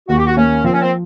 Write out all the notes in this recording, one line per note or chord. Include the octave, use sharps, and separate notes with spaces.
D#2 F#4
G4
F#4
A#3 C#4
F3 C4
C#4
C4